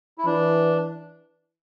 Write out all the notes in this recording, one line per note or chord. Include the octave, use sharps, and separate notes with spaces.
E4
E3 D4